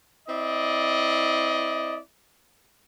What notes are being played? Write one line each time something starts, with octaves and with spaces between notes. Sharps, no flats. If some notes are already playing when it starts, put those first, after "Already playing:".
C4 E4 D5 D#5